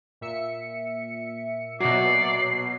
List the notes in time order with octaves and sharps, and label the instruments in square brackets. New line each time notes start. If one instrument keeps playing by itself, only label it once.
[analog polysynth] A#2 E5 C#7
[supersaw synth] B2 F#3 [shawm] D5 [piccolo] C7